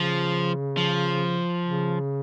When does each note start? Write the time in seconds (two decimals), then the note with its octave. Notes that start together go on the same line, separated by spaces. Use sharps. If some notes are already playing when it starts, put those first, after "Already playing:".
Already playing: C#3 F3
0.77 F3
1.63 C#3